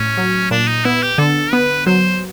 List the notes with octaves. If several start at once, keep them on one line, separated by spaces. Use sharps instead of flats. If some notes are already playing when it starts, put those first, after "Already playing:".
Already playing: A2 C#4
F#3
A#2 D4
D#4
B3 E4
G4
D3 A4
B3 B4
F#3 C5